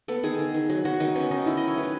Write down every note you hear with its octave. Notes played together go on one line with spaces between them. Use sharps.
B3 A4
D#3 G#4
D#3
D#3
F#3
F#3 F#4
D#3 D#4
B3 C#4
D#3 D#4
D#3 E4
F#3 D#5
C#5
A3 B4